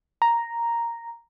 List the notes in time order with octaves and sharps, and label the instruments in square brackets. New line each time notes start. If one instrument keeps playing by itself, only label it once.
[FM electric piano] A#5